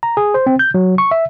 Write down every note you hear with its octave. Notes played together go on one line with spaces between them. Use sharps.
A#5
G#4
C5
C4
G6
F#3
C#6
E5